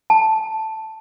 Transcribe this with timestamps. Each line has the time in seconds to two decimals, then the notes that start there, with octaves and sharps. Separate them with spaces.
0.10 A5